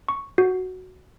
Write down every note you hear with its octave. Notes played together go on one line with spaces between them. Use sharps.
C#6
F#4